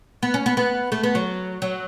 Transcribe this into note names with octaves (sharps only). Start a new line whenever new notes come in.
B3
C#4
B3
B3
A3
B3
F#3
F#3